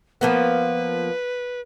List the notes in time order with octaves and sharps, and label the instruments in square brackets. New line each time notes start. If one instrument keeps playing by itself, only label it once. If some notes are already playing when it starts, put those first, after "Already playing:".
[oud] F3 A#3 B3 [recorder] B4